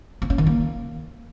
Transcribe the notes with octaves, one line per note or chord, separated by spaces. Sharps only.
C4
C#4
D#3
A#3